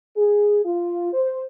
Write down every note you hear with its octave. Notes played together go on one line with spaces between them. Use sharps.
G#4
F4
C5